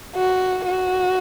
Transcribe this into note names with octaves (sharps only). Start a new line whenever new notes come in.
F#4
F#4